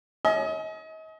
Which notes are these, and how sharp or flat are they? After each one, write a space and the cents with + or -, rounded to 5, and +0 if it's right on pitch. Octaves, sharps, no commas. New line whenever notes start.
D#5 +35 G#5 +40